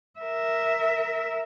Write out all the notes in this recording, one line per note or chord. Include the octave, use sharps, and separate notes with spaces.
A#4 E5